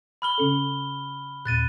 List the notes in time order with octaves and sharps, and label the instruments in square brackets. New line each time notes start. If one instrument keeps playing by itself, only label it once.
[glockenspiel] B5 F6 G7
[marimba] C#3 C#4 A4
[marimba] D#2 A#2 [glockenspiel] F#6 A6 D#7